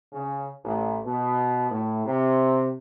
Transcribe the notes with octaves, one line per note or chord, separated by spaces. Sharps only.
C#3
A1
B2
A2
C3